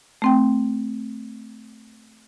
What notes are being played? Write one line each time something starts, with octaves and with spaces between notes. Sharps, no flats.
A3 C4 G5